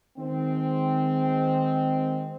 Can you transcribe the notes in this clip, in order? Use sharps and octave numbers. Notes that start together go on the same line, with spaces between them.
D#3 G#3 C4